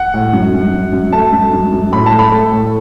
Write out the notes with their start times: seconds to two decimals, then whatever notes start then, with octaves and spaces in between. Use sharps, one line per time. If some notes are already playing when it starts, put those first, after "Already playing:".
Already playing: F#5
0.14 A2
0.33 F#2
0.54 F#2
0.74 F#2
0.93 F#2
1.13 A3 A5
1.33 F#2
1.53 F#2
1.72 F#2
1.92 A2 B5
2.06 A5
2.12 A3
2.19 B5
2.32 A3 A4
2.52 A2